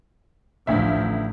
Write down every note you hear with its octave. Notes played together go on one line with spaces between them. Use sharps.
A1 D2 F3 E5
A1